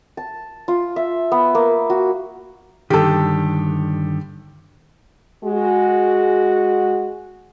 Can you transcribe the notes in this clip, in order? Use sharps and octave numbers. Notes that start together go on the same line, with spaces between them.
A5
F4
E5
B3
A#3
F#4
G2 D3 D#3 G4 A4
G#3 F#4